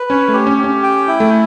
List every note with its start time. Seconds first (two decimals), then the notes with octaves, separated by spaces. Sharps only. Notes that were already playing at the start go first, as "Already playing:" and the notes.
Already playing: B4
0.10 C#4 C#5
0.28 A3
0.33 G4
0.47 C#4
0.58 G4
0.64 C#4
0.83 G5
1.07 E4
1.20 A3